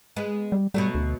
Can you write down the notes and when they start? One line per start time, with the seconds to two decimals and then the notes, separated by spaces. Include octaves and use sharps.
0.16 G#3 B3
0.52 G3
0.74 B2 F#3 G3 A3
0.95 D2